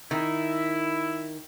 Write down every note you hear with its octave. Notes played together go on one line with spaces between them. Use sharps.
D#3 E4